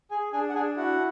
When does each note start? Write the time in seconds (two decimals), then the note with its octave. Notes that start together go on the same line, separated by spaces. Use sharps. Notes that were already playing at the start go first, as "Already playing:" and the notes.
0.11 G#4 G#5
0.32 D4 G#4 G#5
0.49 F#5
0.55 D4 G#4 G#5
0.77 E4 F#4 F#5